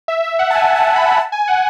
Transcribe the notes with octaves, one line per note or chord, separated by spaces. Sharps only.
E5
E5
F#5
A5
G#5
A5
B5
A5
G#5
F#5